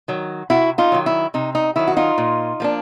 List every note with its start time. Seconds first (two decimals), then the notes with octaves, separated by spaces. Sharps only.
0.08 D#3 F#3
0.50 C3 E4 F#4
0.78 D#4 F4
0.92 D#3 F#3
1.06 E4
1.34 C3 D#4
1.55 D#4
1.76 D#3 F#3 E4
1.88 F#4
1.97 D#4 F4
2.18 A#2
2.60 F3 A#3 D4